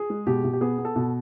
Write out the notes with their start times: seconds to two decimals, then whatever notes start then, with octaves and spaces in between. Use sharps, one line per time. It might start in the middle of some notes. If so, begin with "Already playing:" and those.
Already playing: G#4
0.10 G#3
0.27 B2 G4
0.44 B2
0.53 G4
0.61 B3 G#4
0.78 B3
0.85 A4
0.96 B2